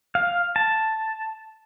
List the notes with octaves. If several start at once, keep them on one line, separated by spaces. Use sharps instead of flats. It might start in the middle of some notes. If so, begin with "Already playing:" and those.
F5
A5